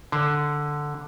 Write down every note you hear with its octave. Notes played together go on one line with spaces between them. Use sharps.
D3